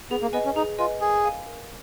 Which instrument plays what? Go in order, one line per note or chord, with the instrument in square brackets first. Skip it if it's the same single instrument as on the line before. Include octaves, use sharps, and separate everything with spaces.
[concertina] B3 [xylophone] G#4
[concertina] A#3
[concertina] B3 [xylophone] B4 D#5 G#5
[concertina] C#4
[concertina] D#4 [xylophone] G#4
[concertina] F4 [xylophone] B4 D#5 G#5
[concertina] G#4 [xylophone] A#4
[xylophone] F5 G#5
A#4